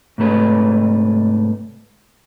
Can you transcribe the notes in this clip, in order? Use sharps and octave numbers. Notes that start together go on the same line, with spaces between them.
G#2 C3 A3 B4 C#5